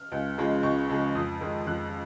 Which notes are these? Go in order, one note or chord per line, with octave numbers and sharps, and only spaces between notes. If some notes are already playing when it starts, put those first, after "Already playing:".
Already playing: F6
C#2
C#3 F3 G#3
C#2 C#6
C#3 F3 G#3
F2 D#6
D#3 G#3
F2 F#6